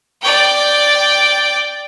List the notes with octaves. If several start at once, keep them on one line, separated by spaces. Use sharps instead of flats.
D5 G5